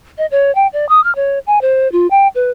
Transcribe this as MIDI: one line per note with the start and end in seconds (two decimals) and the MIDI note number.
0.18 0.26 75
0.31 0.54 73
0.55 0.67 79
0.73 0.88 74
0.89 1.03 87
1.04 1.14 89
1.16 1.39 73
1.47 1.61 80
1.61 1.90 72
1.92 2.07 65
2.11 2.28 79
2.35 2.51 71